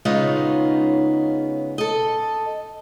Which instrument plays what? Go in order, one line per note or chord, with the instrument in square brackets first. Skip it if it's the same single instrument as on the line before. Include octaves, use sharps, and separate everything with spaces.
[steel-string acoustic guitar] C#3 G#3 B3 D#4 F4 C#5
A4 D#5